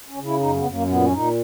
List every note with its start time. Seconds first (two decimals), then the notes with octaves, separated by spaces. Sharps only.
0.08 C#4
0.16 C#3
0.25 E4
0.40 F#2 D#4
0.56 B3
0.64 F#2
0.72 A#3
0.88 A#2 B3
1.02 C#4
1.12 A#2 D#4